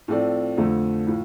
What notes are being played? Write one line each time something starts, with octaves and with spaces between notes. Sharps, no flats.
A2 F3 C4 A4 D5
F2 D3 A3
A2 F3